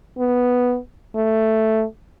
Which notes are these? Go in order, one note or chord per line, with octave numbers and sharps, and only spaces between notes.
B3
A3